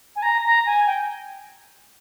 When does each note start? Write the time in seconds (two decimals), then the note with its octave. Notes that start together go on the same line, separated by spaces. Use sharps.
0.16 G#5
0.22 A#5
0.44 A#5
0.66 G#5
0.87 G5